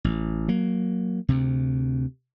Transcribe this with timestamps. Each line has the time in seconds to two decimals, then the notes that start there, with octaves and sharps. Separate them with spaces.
0.04 A1
0.48 F#3 A#3
1.29 D2 C3